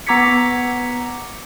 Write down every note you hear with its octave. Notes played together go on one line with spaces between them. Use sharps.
B3 A#5 D6 G#6 B6 C#7